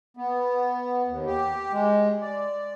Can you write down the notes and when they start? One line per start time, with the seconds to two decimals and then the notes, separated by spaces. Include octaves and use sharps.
0.17 B3
1.08 D#2
1.26 G4
1.72 G#3
2.21 D5